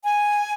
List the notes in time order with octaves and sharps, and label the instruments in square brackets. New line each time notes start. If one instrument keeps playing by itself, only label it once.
[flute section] G#5